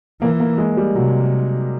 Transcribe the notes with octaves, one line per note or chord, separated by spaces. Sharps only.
E3 A#3
A#3
G#3
G3
C3 F#3